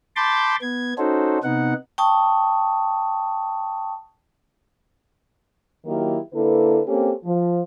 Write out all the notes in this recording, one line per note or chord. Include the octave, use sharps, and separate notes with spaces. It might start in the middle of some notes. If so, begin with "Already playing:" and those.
A5 B5 C6 D6 G6 A6
B3 G#6
C#4 D#4 F#4 A4 C5
C3 B3 D#4 F#5
G5 A5 C#6 D#6
D#3 F#3 A#3 E4 G4 A#4
D3 A#3 E4 A4 B4
A#3 C4 C#4 G4 A4
F3